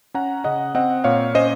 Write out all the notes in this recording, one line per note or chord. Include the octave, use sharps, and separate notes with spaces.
C#4 F#5 A#5
C#3 D#5 F#5
C4 D#5 F#5
A#2 C#5 F5
C#4 C5 D#5